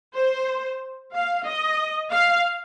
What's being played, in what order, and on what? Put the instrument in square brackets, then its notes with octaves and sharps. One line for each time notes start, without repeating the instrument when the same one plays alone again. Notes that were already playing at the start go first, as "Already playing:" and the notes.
[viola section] C5
F5
D#5
F5